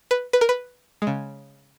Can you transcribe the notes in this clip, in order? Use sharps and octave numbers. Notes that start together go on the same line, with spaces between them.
B4
B4
A#4
B4
G#3
C#3